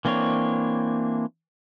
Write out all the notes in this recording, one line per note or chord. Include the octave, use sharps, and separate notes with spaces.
E3 A#3 C4 D4 C#5